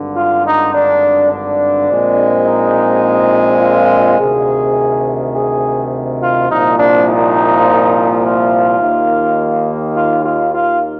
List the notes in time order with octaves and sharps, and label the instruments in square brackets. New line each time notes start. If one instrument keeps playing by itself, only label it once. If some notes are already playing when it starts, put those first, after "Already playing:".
Already playing: [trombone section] G#1 G2 D3
F4
D#4
D4
D4
A#1 A#2 G#3 C4
D#4
F4
D2 C3 D#3 G#4
G#4
F4
C2 A#2 F3 A#3 D#4
D4
D#4
F4
D#2 D#3 A#3
F4
F4
F4